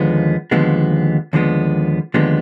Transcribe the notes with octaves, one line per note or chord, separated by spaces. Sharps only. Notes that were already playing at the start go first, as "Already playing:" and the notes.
Already playing: D#2 D3 F3 G#3 B3
D#2 D3 F3 G#3 B3
D#2 D3 F3 G#3 B3
D#2 D3 F3 G#3 B3